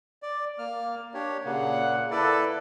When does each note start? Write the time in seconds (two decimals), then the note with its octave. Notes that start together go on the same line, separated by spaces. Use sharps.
0.23 D5
0.59 A#3 F6
1.14 D4 G4 C#5
1.45 A#2 C#3 A#3 F#5
2.11 E4 A4 B4 D5